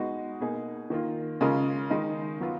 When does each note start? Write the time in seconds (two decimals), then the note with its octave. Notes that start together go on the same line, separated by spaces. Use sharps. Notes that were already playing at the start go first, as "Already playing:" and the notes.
Already playing: G#3 B3 D#4 F#4
0.40 B2 A#3 D#4 G#4
0.90 D#3 A#3 F4
1.41 C#3 G#3 C#4 F4 A#4
1.90 D#3 G#3 D#4
2.40 F#3 B3 F4